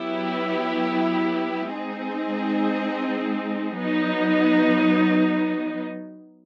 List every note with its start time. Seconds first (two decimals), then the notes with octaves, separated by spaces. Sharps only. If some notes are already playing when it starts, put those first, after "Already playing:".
Already playing: F#3 B3 E4 G4
1.74 G#3 C4 D#4 G#4
3.78 F#3 B3 D#4